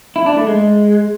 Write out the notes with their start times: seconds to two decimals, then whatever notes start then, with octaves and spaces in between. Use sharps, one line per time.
0.16 E4
0.26 D4
0.37 A3
0.47 G#3